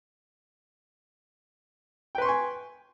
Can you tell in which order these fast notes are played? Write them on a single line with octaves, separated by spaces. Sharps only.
G5 B4 C6 C#6 G#5